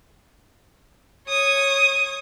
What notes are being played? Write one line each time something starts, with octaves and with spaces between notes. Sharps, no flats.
C#5 D#6